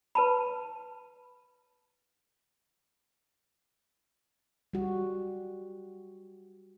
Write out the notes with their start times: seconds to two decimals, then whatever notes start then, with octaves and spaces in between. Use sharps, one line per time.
0.15 B4 A5 B5
4.73 G3 F#4